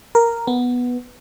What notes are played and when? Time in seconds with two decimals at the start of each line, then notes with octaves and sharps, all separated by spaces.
0.15 A#4
0.47 B3